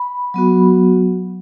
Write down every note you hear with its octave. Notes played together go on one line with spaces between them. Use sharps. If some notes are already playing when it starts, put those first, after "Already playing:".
Already playing: B5
F#3 B3 F#4